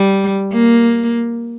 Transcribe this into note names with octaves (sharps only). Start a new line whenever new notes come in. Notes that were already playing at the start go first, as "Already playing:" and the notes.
Already playing: G3
A#3